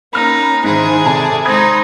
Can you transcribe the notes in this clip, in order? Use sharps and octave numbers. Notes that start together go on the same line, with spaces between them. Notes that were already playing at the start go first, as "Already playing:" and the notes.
A#3 C#4 D#4 B5 F6
G#2 D#3 C4 E4 G#4
C3 A4 D5 A5
G#3 C4 D#4 B5 D#6 G#6